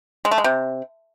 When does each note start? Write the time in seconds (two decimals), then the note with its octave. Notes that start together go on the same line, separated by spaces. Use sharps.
0.25 G#3
0.31 A3
0.38 G#3
0.44 C3